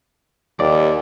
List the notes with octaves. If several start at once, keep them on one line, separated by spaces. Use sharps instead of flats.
D#2 D5